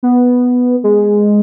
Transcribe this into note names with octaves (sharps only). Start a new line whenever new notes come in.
B3
G#3